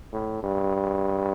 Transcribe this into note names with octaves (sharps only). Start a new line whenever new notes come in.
A2
G2